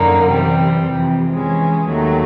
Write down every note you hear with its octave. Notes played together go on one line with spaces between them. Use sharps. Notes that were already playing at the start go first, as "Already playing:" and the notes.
Already playing: F#2 D3 F#3 A#3 D#4
C3 E3 G3 C4
F2 C3 E3
E3 G#3 C#4
D#2 D#3 F#3 A3